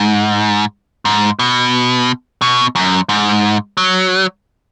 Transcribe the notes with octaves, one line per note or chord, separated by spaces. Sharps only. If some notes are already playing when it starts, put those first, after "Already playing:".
Already playing: G#2
G#2
B2
B2
F#2
G#2
F#3